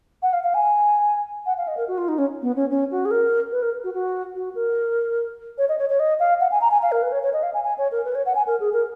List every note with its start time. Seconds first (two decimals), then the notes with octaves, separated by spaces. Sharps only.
0.23 F#5
0.33 F5
0.44 F5
0.54 G#5
1.46 F#5
1.57 F5
1.68 D#5
1.77 A#4
1.88 F#4
1.98 F4
2.08 D#4
2.18 C#4
2.42 B3
2.56 C#4
2.70 C#4
2.91 F#4
3.05 G#4
3.11 A#4
3.52 B4
3.62 A#4
3.84 F#4
3.94 F#4
4.35 F#4
4.55 A#4
5.58 C#5
5.69 D#5
5.78 C#5
5.89 C#5
5.99 D#5
6.20 F5
6.40 F#5
6.51 G#5
6.61 A#5
6.71 G#5
6.82 F5
6.92 A#4
7.02 B4
7.12 C#5
7.23 C#5
7.33 D#5
7.43 F5
7.54 G#5
7.64 G#5
7.78 C#5
7.92 A#4
8.05 B4
8.15 C#5
8.26 F#5
8.35 G#5
8.47 A#4
8.60 G#4
8.73 A#4